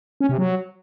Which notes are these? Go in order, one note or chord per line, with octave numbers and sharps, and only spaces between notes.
C#4
C3
F#3